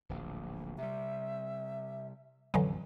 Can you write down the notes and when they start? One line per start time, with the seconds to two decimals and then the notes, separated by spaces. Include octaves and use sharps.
0.09 D1 A#1
0.78 C3 G3 E5
2.54 A1 F2 D3 E3 F#3